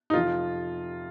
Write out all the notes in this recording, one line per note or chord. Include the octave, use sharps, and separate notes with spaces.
D#4
F2 C3 F3 F4